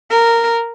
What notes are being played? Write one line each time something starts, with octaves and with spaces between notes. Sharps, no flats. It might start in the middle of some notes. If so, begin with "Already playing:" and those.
A#4